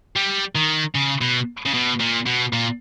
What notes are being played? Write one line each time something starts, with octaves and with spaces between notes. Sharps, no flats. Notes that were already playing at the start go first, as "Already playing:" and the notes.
G3
D#3
C#3
B2
C#3
B2
A#2
B2
A#2